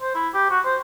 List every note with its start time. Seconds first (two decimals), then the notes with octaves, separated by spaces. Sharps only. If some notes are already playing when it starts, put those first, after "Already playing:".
0.02 C5
0.15 E4
0.34 G4
0.50 F#4
0.65 C5